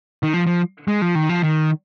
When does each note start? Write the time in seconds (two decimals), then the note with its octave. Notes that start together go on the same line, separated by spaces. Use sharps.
0.23 D#3
0.34 F3
0.46 F3
0.88 G#3
1.02 F3
1.15 D#3
1.29 F3
1.43 D#3